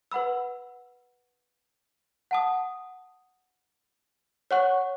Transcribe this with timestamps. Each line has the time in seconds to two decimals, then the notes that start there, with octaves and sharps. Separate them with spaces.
0.11 B4 F#5 B5 E6
2.31 F#5 A5 D#6
4.51 C#5 F#5 C#6 F#6